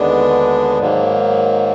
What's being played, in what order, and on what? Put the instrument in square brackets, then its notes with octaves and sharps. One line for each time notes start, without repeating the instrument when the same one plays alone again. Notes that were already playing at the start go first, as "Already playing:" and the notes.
Already playing: [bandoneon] D#2 D3 G#3 B3 D4
G#2 D#3 F#3 A#3